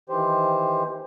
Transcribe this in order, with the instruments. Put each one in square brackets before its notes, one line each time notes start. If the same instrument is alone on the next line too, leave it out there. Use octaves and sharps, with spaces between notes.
[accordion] D#3 E3 G4 C5